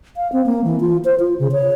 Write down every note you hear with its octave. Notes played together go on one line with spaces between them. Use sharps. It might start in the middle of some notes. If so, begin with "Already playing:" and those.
F5
C4
A#3
E3
F4
C5
F4
C#3
C#5